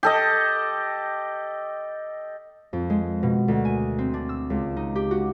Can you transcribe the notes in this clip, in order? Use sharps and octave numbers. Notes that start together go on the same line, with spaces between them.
G4 A4 D#5
F2
G#3
B2
D2
G#5
C4
D4
E6
C#2
D#4
G4
F#4